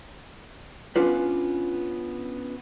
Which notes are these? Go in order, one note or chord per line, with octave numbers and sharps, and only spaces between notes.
B3 C#4 D4 F4 B4